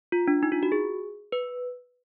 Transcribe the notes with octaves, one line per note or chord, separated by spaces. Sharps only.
F4
D4
D#4
F4
F#4
G#4
B4